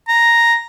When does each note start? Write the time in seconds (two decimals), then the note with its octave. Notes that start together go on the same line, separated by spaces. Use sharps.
0.08 A#5